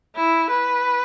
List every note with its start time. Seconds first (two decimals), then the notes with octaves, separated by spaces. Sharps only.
0.16 E4
0.51 B4